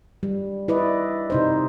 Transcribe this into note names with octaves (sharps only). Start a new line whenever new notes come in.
G3
E4 B4 D5 D#5
C3 D#4 C5